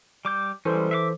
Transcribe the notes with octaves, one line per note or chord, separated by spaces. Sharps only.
G3 D6 G6
E3 G3 G#3 C#4 A4 C5
E5 F5 D6